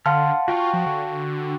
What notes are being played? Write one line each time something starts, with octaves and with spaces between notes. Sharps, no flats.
D3 F5 F#5 A5 C6 F6
F4 F#4 G5 C#6
F3
D3